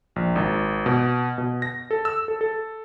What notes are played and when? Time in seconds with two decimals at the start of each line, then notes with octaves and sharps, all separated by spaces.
0.16 A#1
0.36 G#1
0.86 B2
1.38 B2
1.62 A#6
1.91 A4
2.05 E6
2.28 A4
2.41 A4